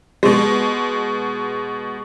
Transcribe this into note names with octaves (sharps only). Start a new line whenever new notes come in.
B2 G#3